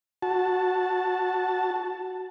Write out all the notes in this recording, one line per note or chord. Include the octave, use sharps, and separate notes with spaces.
F#4 A5